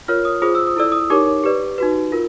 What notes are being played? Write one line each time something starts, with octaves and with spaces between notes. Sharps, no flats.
F4 A#4 C#5 F6
D#6
F4 G#4 C5 D#6
E6
D#6
E4 A4 D5 E6
D#6
D#4 G4 A#4 C#5 D6
G4 B4 D5
D#4 F#4 B4
F4 A#4